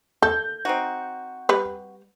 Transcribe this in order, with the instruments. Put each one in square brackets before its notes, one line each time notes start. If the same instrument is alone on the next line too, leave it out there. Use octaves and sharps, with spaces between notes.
[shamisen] A4 [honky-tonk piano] G6
[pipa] C4 D#4 F#4
[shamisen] G3 B4